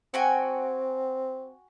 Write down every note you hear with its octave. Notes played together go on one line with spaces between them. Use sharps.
C4 F#4 G5 G#5